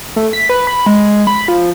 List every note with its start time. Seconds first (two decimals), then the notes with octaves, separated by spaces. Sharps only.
0.16 A3
0.33 B6
0.49 B4
0.67 B5
0.86 G#3
1.27 B5
1.48 F3